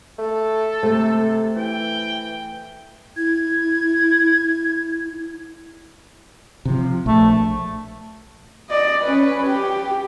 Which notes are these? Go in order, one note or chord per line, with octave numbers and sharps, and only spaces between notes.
A3 A4
C3 A3
E3 G5
E4 G#6
C3 F3
A#1 A3
D5 D#5
C#4 B4
G4